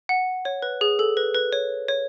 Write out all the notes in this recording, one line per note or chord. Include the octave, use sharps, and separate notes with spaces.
F#5
C#5
B4
G#4
A4
B4
B4
C#5
C#5